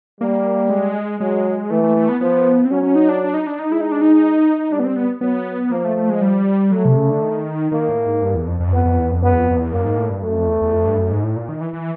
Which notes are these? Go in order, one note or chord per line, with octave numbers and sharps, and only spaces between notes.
G3 A#3
G#3
F#3 G#3
E3 A3
A3
A3
B3
F3 B3
C4
F#3 C#4
C#4
D#4
D4
D4
D#4
D4
D#4
G#3 E4
D#4
D4
D#4
G3 D4
B3
C4
B3
F#3 B3
F3 A#3
A3
A3
G#3
G3
F#3 A3
C3
C#3
D3
D#3
D#3 A#3
A2
G#2
G2
E2
F2
F2
F#2
F2 B3
F2
E2
F2
F#2 B3
E2
F2
F2
E2
F#2 A#3
G#2
A2
G2
F#2 A3
F2
E2
E2
F2
G2
F#2
G#2
A2
A#2
D#3
E3
E3